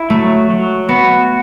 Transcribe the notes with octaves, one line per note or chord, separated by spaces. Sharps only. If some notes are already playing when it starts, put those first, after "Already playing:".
Already playing: E4
F#3 A3
F#3
B3 F#4